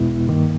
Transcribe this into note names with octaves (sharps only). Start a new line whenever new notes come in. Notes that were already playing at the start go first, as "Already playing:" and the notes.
Already playing: E2 B2 G#3 B3 E4
G2 D#3 A#3